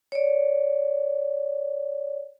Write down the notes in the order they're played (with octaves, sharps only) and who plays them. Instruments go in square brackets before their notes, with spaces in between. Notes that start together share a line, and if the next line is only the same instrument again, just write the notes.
[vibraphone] C#5 D5